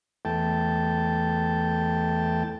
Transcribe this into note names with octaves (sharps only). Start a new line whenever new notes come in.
E2 A3 G5 A5